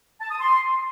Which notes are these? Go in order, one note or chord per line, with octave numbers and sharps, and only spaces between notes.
A5
D#6
C6